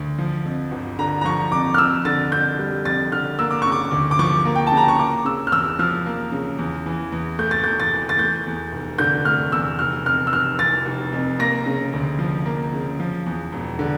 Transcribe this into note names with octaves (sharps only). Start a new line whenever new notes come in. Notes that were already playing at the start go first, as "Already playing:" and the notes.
Already playing: D2
F3
F2
G1
D3 A#5
A#5
F3 C#6
F2 D6
F6
F2 E6
D3 A6
F2 G6
G3
F2 A6
D3 F6
A#3 E6
D6
C#3 C#6
D6
D2
D6
F3 C#6
A#3
G5
A5
C#3
A#5
C#6
A#3 D6
C#3 E6
F6
E2 E6
F3 F6
A#3
C#3
E2
E3
E2
A3 G6
A6
E2 G6
A6
E3
A6
A3 G6
E2
F1
D3 G6
A3 F6
E2 E6
F1 F6
F2 F6
E6
F1 F6
E3 A6
F1
F2
A#3 A#6
C#3
D2
F3
A#3
C#3
F3
E2
E1
D3